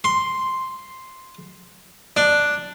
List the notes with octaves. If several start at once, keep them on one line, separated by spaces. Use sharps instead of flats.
C6
D4